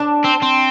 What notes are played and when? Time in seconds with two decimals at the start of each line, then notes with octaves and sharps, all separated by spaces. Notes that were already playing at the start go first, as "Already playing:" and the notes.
Already playing: D4
0.24 C4
0.42 C4